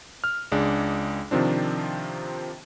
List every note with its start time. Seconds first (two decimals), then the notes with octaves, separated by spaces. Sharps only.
0.24 F6
0.52 C#2 G#3 D4
1.31 C3 D#3 F3 C4 D4